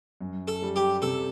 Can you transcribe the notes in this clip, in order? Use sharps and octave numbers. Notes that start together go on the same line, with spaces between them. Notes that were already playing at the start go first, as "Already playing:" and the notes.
F#2
A4
G3
G4
C3 A4